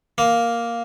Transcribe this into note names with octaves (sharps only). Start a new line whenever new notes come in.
A#3